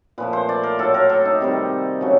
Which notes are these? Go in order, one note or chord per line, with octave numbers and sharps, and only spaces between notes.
A#2 F3 A3 B4
C5
D5
A#4
A2 F#3 A3 A4
A#4
A4
D#4
C3 D#3 G3
C#3 F#3 A3